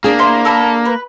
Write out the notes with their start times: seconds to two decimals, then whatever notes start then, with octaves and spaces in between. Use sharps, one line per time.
0.04 A#3 D4 G#4
0.19 E4 C5 C6
0.45 A4 A#4 B5
0.85 B4